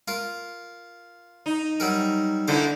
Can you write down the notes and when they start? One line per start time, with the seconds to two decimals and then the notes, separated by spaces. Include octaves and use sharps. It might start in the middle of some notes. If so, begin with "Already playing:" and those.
0.08 F4 A#4
1.46 D#4
1.80 F#3 G3 A#4
2.48 D3 A#3 D#4 E4 C5